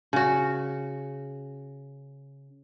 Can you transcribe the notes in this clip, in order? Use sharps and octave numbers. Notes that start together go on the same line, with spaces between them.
C#3 F#4